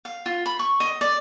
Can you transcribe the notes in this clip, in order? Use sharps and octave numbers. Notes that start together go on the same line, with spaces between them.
F5
F4
B5
C#6
D#5
D5